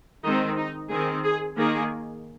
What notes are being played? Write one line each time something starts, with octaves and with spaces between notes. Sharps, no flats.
D#3 G#3 C4 D#4
D#4
D#3 C4 G#4
G#4
D#3 A#3 G#4